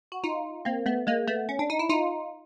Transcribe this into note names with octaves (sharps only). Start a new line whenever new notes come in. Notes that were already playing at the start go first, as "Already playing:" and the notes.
F#4
D#4 F4
A#3 C4
A3 B3
G#3 A#3
A3 B3
C#4
D4
D#4
E4
D#4 F4